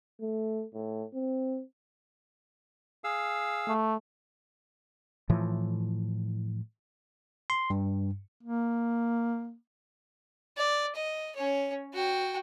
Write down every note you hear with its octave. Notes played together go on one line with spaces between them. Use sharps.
A3
A2
C4
G#4 F5 E6
A3
A2 E3 F3
C6
G2
A#3
D5
D#5
C#4 C#5
F#4 G5